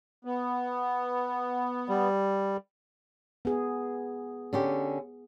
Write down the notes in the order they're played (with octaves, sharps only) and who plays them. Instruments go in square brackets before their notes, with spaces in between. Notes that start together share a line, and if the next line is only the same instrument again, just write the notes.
[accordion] B3
[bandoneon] G3
[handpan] B3 G#4
[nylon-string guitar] D3 C#4 G4